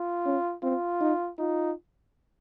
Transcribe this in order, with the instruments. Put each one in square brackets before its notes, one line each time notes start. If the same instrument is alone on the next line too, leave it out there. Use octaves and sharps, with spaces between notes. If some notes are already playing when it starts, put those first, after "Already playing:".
Already playing: [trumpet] F4
[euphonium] C#4
[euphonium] C4 [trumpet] F4
[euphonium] D#4
[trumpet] D#4 [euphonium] F4